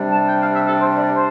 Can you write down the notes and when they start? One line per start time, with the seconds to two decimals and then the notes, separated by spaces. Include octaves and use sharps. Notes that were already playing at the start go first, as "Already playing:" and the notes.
Already playing: C3 G3 D4
0.12 A5
0.29 G5
0.42 F5
0.55 E5
0.67 A4
0.80 C5
0.97 D5
1.14 C5